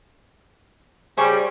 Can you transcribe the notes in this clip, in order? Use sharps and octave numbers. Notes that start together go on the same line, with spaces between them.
C#3 G3 C5 G#5 C#6